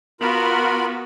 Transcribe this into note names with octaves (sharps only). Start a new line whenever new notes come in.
B3 F4 F#4 A#4 B5